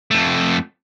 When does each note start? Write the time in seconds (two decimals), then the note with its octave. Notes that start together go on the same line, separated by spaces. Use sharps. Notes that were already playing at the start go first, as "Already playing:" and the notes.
0.11 F2 A3